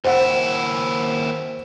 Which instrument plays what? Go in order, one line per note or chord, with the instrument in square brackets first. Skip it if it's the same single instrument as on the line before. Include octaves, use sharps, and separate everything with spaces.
[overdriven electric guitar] D#2 E4 [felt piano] C5 F#5